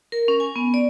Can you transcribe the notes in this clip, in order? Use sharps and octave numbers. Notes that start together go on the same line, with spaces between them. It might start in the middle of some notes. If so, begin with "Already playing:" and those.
A#4
C#4
G#5
B3
D5